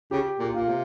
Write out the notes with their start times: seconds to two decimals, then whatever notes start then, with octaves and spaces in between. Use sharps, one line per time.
0.11 C#3 G4
0.39 A#2 G4
0.54 A#2 F4
0.68 C3